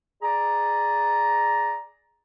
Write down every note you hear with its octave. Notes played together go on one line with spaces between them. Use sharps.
G#4 D5 A#5